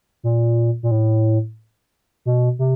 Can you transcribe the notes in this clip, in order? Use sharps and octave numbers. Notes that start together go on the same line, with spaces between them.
A#2
A#2
A2
B2
C3